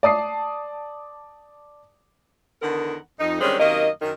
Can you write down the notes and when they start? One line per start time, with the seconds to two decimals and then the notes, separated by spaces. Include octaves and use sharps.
0.03 D5 A5 D#6 C7
2.62 E2 D3 D#3 B3 A#4 F#5
3.20 F2 D#4
3.41 D3 D#3 G3 G#3 C4 C#4
3.60 F#2 C3 D#3 A#3 D#5
4.02 F#2 D#3